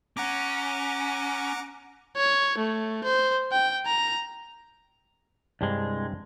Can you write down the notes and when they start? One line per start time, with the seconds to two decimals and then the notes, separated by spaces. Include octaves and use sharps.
0.17 C#4 F#5 A#5 D6
2.17 C#5
2.58 A3
3.04 C5
3.52 G5
3.86 A#5
5.61 C2 G2 G#3 C4 D4